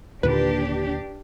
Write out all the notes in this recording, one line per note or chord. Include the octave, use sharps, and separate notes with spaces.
D#2 A#2 D3 D4 G4 B4